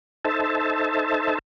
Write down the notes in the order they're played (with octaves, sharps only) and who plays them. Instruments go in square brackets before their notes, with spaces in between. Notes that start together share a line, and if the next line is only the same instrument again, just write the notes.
[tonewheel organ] D#4 A4 C5 E5 A5